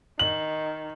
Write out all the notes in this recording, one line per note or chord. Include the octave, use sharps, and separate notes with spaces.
D#3 F#7